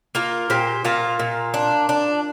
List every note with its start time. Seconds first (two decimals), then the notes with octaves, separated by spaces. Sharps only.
0.15 A#3 F4 A#4
0.50 A#2 G4 C5
0.85 A#2 F4 A#4
1.19 A#2
1.54 D4
1.89 D4